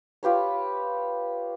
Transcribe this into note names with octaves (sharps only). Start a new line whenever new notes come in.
F4 G4 B4 C#5